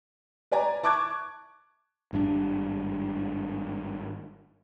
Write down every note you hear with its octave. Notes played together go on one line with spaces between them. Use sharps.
B4 D5 G#5 A#5
A5 C#6 D6 F#6 G#6
G#1 G2 D#3 D4